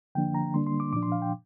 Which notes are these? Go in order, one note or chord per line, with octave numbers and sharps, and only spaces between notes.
D3 F3 A#3 D4 G5
A#5
D3 G3 A#3 D4 C6
C6
D6
A#2 F3 D4 D6
C6
F5
G5